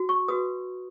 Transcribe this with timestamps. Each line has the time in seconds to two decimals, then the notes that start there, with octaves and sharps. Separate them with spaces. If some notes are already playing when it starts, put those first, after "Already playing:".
Already playing: F#4
0.09 C#6
0.28 F#4 B4 D#6